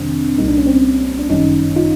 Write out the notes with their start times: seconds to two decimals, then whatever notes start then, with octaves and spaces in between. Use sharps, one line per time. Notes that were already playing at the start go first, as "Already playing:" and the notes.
Already playing: F2 C3 D#3 G3 C4 D4
0.38 C2 A#2 G3 A#3 D#4
0.48 D4
0.58 C#4
0.66 C4 D4
1.19 D4
1.30 G1 F#2 D#3 G3 C#4 D#4
1.76 D#4 F4